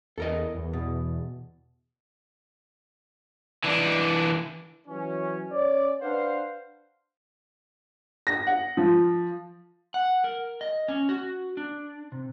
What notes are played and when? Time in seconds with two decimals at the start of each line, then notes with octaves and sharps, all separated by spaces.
0.18 E2 A4 A#4 D#5
0.55 E2
0.73 B2
3.64 E3 D4
4.88 E3 F#3 C#4
5.52 C#4 C#5 D5
6.01 D4 B4 C5 F5 F#5
8.27 A#6
8.47 F#5
8.77 F3
9.94 F#5
10.24 A#4
10.61 D#5
10.88 C#4
11.09 F#4
11.57 D4
12.12 C3